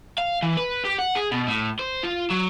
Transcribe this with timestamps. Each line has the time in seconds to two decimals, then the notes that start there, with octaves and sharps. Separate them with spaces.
0.18 F5
0.43 E3
0.57 B4
0.85 G4
0.99 F#5
1.16 G#4
1.32 B2
1.48 A2
1.79 C5
2.03 F4
2.30 F#3